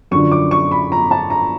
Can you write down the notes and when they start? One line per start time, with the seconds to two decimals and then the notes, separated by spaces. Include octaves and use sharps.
0.11 F#2 D3 F3 C#6
0.31 D6
0.51 C#6
0.71 B5
0.92 A#5
1.11 A5
1.30 A#5